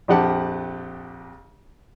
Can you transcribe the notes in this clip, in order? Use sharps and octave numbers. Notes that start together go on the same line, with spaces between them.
A#1 F2 G4 F#5 A5